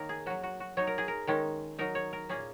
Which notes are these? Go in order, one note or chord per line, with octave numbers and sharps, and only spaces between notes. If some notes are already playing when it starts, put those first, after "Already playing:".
Already playing: D#3 A#3 D#4 A#4 C#5
G#4
F#3 C#4 F#4
F#4
F#4
F#3 D#4 C#5
A#4
G#4
A#4
D#3 G#3 C#4
F#3 D#4 A#4
C#5
A#4
A#2 A#3 C#4 G#4